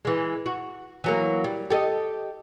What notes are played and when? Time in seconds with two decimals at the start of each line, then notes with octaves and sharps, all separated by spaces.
0.05 E3 G#3
0.46 F#4
1.04 E3 F#3 A#3
1.44 G3
1.70 G4 A4 D#5